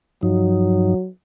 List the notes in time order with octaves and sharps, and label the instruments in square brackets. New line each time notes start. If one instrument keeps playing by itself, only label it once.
[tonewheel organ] G2 F3 D#4 [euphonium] F#3